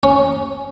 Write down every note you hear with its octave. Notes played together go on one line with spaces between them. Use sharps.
C#4